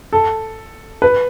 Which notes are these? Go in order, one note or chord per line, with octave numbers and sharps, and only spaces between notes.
A4
B4